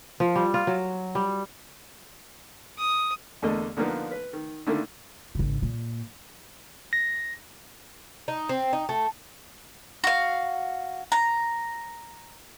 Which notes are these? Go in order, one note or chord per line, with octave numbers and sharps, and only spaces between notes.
F3
G3
F4
F#3
G3
D#6
E2 D3 A3 A#3 D#5
D3 F3 A#3 B3 D#4
B4
D#3
D3 D#3 A3 A#3 D4 E4
G#1 C#3
A#2
A#6
D#4
C4
D#4
A3
F#4 F5
A#5